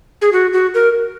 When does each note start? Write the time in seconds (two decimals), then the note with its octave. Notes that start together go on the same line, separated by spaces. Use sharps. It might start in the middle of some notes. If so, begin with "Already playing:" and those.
0.22 G#4
0.32 F#4
0.53 F#4
0.74 A#4